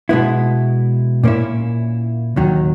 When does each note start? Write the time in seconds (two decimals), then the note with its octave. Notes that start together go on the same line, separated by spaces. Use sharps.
0.09 B2 G#3 B3 E4
1.24 A#2 A#3 C#4 E4
2.36 D#2 D#3 F#3